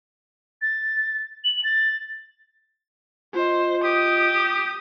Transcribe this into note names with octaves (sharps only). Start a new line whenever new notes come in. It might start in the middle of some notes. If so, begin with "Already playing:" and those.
A6
F#7
A6
F4 C5 D#5
G4 D#6